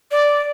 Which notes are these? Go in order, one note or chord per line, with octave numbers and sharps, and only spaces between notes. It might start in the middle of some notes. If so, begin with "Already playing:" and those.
D5